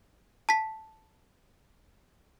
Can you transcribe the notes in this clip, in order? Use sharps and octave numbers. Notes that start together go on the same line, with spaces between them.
A5 B6